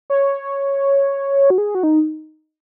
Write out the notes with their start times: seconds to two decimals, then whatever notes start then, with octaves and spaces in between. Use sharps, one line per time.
0.10 C#5
1.50 F#4
1.58 G#4
1.75 F#4
1.83 D#4